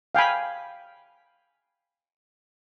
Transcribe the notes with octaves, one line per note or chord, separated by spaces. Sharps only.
F5 G5 G#5 B5